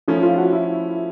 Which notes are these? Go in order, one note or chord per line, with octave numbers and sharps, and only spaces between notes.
F3 A3 C#4 D#4 E4
F4
F#4
E4